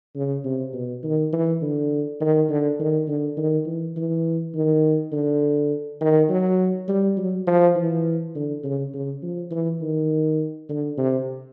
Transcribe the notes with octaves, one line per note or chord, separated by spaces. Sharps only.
C#3
C3
B2
D#3
E3
D3
D#3
D3
D#3
D3
D#3
E3
E3
D#3
D3
D#3
F#3
G3
F#3
F3
E3
D3
C#3
C#3
F3
E3
D#3
D3
C3